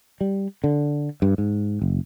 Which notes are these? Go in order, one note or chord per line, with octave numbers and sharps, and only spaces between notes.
G3
D3
G2
G#2
F#1